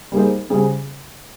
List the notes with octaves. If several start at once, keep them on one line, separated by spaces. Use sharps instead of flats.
G3 A#3 D#4 G#4 C5
C#3 G3 C#4 G#4 C5